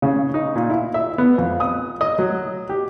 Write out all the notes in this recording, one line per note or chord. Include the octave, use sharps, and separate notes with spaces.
C#3
D#4
A#2
E4
E5
B3
F2
D#6
D#5
F#3
G4